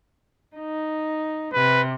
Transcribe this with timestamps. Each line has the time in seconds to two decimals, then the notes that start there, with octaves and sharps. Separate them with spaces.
0.57 D#4
1.53 C3 B4